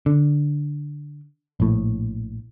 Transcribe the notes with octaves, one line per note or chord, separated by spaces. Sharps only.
D3
A#1 A2